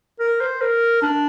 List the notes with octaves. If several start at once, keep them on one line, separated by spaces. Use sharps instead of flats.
A#4
C5
A#4
D4